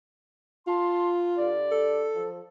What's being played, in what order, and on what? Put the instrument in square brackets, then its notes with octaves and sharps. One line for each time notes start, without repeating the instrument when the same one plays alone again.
[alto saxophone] F4 [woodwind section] A5 C6
[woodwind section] D3 G4 D5
[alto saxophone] A4
[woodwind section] F3